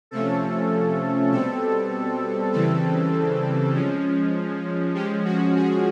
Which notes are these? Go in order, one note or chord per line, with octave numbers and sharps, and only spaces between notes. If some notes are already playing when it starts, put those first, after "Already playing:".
C3 F3 A3 C#4 A4
B2 G3 C4 A4
C#3 E3 G3 C4 A4
F3 G#3 C#4
F3 G#3 C#4 G4
F#4
G#4